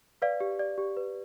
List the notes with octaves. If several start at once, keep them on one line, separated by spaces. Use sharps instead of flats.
B4 D5 F5
G4
D5
G4
B4